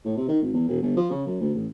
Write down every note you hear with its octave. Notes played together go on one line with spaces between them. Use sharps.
A2
C3
D#3
G#1
E2
E1
G1
F3
C#3
F#2
D2
A1